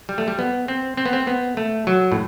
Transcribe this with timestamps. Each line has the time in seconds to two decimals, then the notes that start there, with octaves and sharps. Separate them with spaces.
0.09 G3
0.18 A3
0.28 G3
0.39 B3
0.68 C4
0.97 C4
1.06 B3
1.13 C4
1.27 B3
1.57 A3
1.87 F#3
2.12 A2